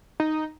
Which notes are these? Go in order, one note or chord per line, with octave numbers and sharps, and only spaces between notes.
D#4